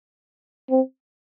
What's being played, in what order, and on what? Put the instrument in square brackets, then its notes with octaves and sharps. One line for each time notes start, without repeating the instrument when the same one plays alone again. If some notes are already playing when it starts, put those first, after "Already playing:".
[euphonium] C4